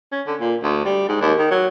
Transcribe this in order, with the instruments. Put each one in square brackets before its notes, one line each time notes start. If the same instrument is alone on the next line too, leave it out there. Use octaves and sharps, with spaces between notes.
[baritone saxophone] C#4
D3
A#2
D2
G3
G#2
D#2
D#3
F#3